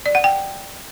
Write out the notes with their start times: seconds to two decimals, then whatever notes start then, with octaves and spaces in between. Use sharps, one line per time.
0.06 D5
0.15 F#5
0.24 G5